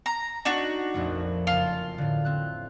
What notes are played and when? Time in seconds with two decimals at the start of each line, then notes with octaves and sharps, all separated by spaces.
0.06 A#5
0.45 D4 D#4 F#4
0.94 A#1 F2 A3
1.47 F#1 F4 G#5 A5
1.98 A2 D3
2.25 C4 F#6